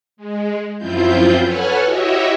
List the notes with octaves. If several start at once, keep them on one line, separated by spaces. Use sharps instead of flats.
G#3
F#2 F3 C4 E4 F4 G6
A4 B4 C#5 F#5 G#5 F6
E4 F#4 G4 C#5 D#5 E5